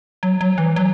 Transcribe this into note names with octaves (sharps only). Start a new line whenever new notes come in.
F#3
F#3
E3
F#3